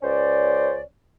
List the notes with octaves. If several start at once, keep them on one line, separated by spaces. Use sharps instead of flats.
C#2 C#4 C5 D5